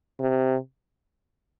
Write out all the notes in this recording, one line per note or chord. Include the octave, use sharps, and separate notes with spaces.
C3